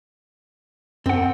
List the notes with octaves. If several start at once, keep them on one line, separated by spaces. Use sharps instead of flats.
F#2 C4 F#5